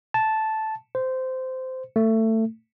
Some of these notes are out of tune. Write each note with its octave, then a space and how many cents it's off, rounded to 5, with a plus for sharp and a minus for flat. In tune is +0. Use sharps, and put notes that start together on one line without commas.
A5 -5
C5 -15
A3 +20